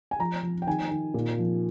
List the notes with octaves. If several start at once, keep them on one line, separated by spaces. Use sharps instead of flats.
G#5
F3 A#5
F3
G5
D#3 G#5
D#3
A#2
F3